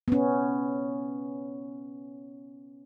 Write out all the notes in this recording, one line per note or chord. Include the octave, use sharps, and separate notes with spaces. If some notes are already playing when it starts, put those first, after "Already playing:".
B3 C#4